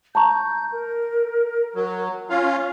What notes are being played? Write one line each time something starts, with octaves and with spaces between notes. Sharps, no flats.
A5 A#5 C#6 G6
A#4
F#3
C#4 F4 F5